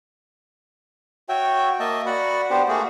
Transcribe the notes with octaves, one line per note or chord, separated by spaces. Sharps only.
F#4 C#5 E5 G5
A#3 D#5 E5 A5
F#4 D5 F#5 B5
B3 D4 G4 C5
A3 A#3 F#4 G#4